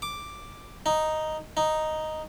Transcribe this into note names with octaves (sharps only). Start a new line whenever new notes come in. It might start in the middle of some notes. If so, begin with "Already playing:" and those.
D6
D#4
D#4